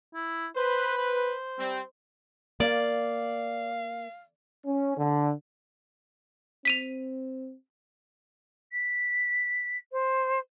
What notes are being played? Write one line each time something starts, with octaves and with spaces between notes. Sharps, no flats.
E4
B4 C5
C5
G3 C4
A#3 D5 F5
C#4
D3
C4 B6 D#7 F7
B6
C5